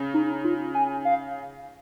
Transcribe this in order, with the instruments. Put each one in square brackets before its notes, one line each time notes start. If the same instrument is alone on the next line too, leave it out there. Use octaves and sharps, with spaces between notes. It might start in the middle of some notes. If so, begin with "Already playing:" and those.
Already playing: [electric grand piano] C#3
[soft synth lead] D#4
D#4
F4
G#5
F5